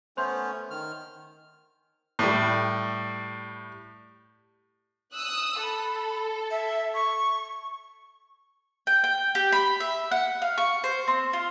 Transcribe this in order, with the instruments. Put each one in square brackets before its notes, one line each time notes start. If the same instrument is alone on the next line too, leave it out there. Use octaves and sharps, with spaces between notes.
[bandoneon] A3 B3 C#4 [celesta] C5 C6 G6
[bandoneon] D#3 F6
[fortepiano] A2 G3
[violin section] D#6 E6 F#6
[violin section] A4 [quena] B5
[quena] E5
C#6
[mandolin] G5
G5
G4
B5
E5
F#5
F5
C#6
C5
C4
F4